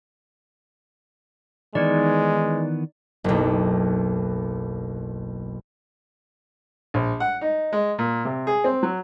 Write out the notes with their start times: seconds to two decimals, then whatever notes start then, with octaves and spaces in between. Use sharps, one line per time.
1.75 D#3 E3 G#3 B3 D#4 D5
3.24 F#1 B1
6.94 A#1
7.20 F#5
7.41 D#4
7.72 G#3
7.99 A#2
8.25 C3
8.47 G#4
8.64 C4
8.83 F#3